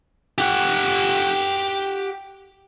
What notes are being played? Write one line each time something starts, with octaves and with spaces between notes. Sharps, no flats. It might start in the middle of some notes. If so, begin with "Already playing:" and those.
G4 F#5